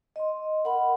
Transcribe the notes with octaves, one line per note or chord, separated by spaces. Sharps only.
D#5 C6
A#4 F#5 B5